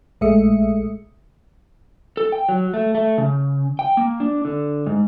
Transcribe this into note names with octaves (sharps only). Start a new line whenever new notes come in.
A#1 G#3 A3 E5 D#6 C#7
A4
G5
F#3
A3
A3
C#3
G5
A#3
D4
D3
G#2